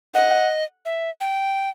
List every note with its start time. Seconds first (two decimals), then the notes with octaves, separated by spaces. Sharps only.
0.15 D#5 F#5
0.85 E5
1.21 G5